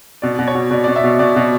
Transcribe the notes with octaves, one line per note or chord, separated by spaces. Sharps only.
B2 D5
B2
C#5
B2
B2 D5
B2 D5
E5
B2
B2 D5
B2